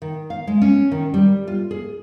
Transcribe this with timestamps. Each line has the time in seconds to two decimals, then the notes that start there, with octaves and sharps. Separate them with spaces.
0.02 D#3
0.30 F5
0.47 G#3
0.62 C#4
0.92 D#3
1.14 G3
1.48 F4
1.71 G#4